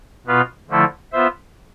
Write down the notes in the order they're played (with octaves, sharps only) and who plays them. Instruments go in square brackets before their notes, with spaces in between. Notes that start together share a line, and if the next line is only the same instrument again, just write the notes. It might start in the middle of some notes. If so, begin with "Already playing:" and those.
[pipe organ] B2 B3 F4 B4 F5
D3 F3 A3 E4 A4
B3 F4 C5 E5